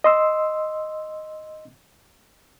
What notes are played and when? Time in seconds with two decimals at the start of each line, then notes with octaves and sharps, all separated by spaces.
0.04 D#5 C6 E6